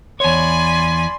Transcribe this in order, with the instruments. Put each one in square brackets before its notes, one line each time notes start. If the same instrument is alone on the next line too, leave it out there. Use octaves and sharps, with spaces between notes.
[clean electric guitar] E2 C#5 [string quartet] D5 G#5 B5 [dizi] C6